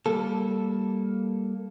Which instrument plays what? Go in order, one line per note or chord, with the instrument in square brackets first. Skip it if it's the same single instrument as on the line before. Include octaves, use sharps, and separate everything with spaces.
[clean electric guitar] G3 A#3 A4